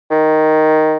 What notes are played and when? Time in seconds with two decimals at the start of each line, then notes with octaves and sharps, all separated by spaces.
0.11 D#3